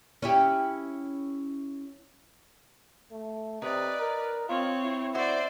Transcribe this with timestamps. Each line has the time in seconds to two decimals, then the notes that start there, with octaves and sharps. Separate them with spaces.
0.22 C#4 E4 G4
3.11 A3
3.62 C3 D#4 B4 D5
4.00 A#4
4.49 C4 F4 C#5
4.82 E4
5.14 C#4 F#4 C5 D5 E5